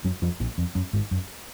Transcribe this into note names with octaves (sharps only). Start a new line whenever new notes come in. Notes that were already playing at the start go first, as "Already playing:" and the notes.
F#2 F#3
F2 F3
A#1 A#2
F2
F#2
G#1 G#2
F#2